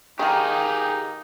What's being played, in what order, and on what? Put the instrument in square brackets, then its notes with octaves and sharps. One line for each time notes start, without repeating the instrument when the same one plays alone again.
[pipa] D#3 A#3 [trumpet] D#4 [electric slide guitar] G4 G#4